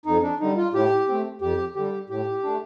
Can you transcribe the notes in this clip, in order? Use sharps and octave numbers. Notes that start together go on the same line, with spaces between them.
F2 D#4
D4
D3 G3 D#4
F4
A2 G4
A3 C4
F2 G4
D3 G3 G4
A2 G4
A3 D4